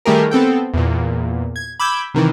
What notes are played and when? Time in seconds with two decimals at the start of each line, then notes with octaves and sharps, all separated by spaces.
0.05 D#3 G3 A3 G4 G#4 A#4
0.31 B3 C4 A4 G5
0.74 E2 A#2
1.56 G#6
1.80 B5 D6 E6 G6 G#6
2.14 C3 D#3 E3